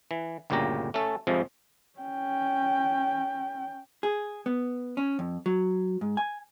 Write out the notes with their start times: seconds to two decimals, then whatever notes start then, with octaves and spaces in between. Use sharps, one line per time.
0.11 E3
0.50 G1 D2 A#2 C#3 G4 A#5
0.94 A3 C#4 A4
1.27 F2 C3 F3 G#3
1.99 C#4 G5
4.03 G#4
4.46 B3
4.97 C#4
5.19 F2
5.46 F#3
6.01 G#2
6.17 G#5